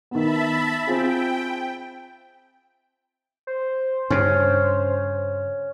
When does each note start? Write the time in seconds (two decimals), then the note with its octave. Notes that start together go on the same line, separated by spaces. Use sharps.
0.11 D#3 B3 E5 A5 B5
0.87 C4 F4 G#4 G5
3.47 C5
4.10 G2 C#3 C#4